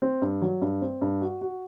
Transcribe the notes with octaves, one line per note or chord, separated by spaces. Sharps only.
C4
G2
F#3
G2
C4
G2
F#4
F#4